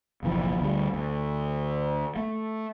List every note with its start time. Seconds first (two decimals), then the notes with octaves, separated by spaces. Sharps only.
0.23 F#1 B1 E3 F3
0.61 D2 D3 G3
0.94 D2
2.16 A3